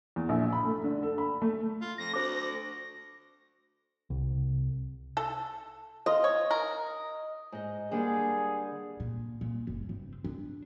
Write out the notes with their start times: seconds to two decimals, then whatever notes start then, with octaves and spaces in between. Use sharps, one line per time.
0.16 E2
0.29 A#1
0.53 B5
0.65 A3
0.84 D3
1.03 A4
1.18 B5
1.42 A3
1.81 F4
1.98 F2 A#6
2.14 D2 C5 D6
4.10 C2
5.17 A4
6.06 F4 D#5
6.24 C#5
6.51 A#4
7.52 G#2 D#5
7.91 D3 G3 A#3 G#4
9.00 A#2
9.41 A#2
9.67 F#1
9.89 G2 C4
10.24 D4